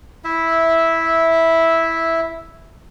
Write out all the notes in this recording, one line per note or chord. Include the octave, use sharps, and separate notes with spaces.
E4 E5